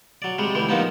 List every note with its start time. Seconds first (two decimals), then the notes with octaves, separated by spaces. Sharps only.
0.22 F#3 D5
0.38 C3 G3 G#3
0.55 D2 E3 G3
0.69 A#2 F3 B3 D#4